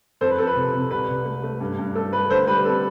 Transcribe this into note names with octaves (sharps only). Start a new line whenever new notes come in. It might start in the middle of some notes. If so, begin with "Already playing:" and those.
F2 A4 C5
B4
F2 A4
B4
C3
C3
C2 B4
C2
A3
A3
G2
G2
A3 A4
A3 B4
D3 A4 C5
G3 B4
C4 A4